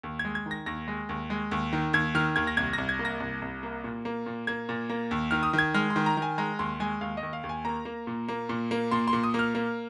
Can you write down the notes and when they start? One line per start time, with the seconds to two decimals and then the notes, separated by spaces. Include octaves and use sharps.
0.03 D#2
0.19 G#6
0.25 G#3
0.35 G#6
0.46 D#3
0.51 A#6
0.66 D#2 A#6
0.88 G#3
1.09 D#2
1.30 G#3
1.51 D#2
1.73 D#3
1.93 D#2 G#6
2.15 D#3 F6
2.36 D#2 G#6
2.47 A#6
2.57 C2 G#6
2.73 C2 A#6
2.89 G#6
2.99 A#3
3.05 A#6
3.20 C2
3.42 C2
3.63 A#3
3.84 A#2
4.05 A#3
4.26 A#2
4.47 A#3 G#6
4.69 A#2
4.90 A#3
5.11 D#2
5.31 D#3 F6
5.43 D#6
5.53 D#3
5.58 G#6
5.74 G#3 F6
5.90 C6
5.96 D#3
6.06 A#5
6.17 D#3 G#5
6.38 G#3 A#5
6.59 D#2 C6
6.80 G#3 G#5
7.01 D#2 F5
7.17 D#5
7.23 D#2
7.33 F5
7.44 D#2
7.49 G#5
7.65 A#3 A#5
7.85 A#3
8.07 A#2
8.29 A#3
8.49 A#2
8.71 A#3
8.91 A#2 C6
9.08 C6
9.13 A#2
9.23 D#6
9.34 A#3
9.39 F6
9.55 A#3